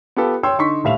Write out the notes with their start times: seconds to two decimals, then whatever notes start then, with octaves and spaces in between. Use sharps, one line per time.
0.16 B3 F4 G4 A4
0.43 C#5 G5 C6 E6
0.58 D3 D#4 C6 C#6 B6
0.84 D#1 A2 A3 E5 F5 F7